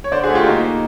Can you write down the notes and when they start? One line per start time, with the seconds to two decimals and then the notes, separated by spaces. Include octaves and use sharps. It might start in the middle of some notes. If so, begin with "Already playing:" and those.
0.04 C#5
0.12 D3 C5 D5
0.24 F#4 G#4
0.29 A3
0.35 F4 G4
0.47 A#3 D#4